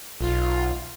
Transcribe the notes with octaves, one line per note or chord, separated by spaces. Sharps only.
B1 F4